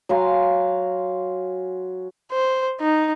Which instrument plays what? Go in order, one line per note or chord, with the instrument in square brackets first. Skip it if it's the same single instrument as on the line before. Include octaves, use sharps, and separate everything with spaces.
[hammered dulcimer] F#3 F5 G#5 C6
[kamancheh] C5
D#4